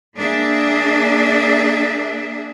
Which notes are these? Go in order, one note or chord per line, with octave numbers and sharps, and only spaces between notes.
A#3 D4 G#4 E5